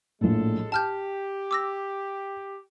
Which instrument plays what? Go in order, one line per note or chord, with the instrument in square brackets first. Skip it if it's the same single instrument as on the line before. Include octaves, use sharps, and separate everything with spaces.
[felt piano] A#1 A2 [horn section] G#3 A4
[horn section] G4 [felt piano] G5 [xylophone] A5 F6 G6
[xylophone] D6 E6 A#6